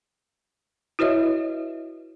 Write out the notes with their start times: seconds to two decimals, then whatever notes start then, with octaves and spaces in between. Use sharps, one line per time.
0.99 E4 F#4 B4 C#5 D#5 E5